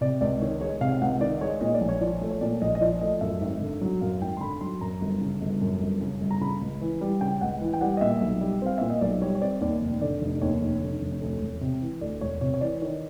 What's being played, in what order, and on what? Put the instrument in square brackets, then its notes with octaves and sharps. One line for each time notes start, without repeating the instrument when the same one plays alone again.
[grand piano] C3 D5
C#2 D5
D#3 C#5
G#3 C#5
C3 F5
F5
C#2 F#5
D#3 D5
G#3 C#5
A#2 D#5
D5
A#1
C#5
F3 D5
A3
C#5
A#2 D5
A#1 D#5
D#5
F3 D5
A3 D#5
F#2 E5
G#1
D3
F#3
F#2 F5
G#1 G5
C6
D3 B5
F#3 C6
F#2 A#5
G1
C#3
G1
F#2
G1
C#3
G1
A#5
C#3 B5
C#2
E3
G3
C#3 G5
C#2 F#5
E3
G5
G3 F#5
D#5
A#2 E5
B1
G3
C4 F5
A#2 E5
D#5
B1 D5
G3 C#5
C#5
C4 D5
D#2 D5
F1
D3 D5
F1
D#2 C#5
F1
D3
F1
D2
E1
C3
E3
D2 D5
E1 C#5
C3 C#5
C#5
E3 D5
D#3 C#5